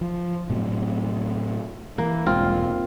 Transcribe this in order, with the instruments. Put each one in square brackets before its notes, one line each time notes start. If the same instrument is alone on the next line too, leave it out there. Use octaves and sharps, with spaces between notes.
[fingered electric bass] F3
A2 C3 F#3
[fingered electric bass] E3 [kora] A#3
[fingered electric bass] E1 C2 G#2 [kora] C4 F4